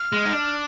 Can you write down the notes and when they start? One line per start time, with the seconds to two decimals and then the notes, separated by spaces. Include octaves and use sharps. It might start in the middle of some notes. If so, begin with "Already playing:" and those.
Already playing: F6
0.12 G#3
0.25 D#4
0.32 D4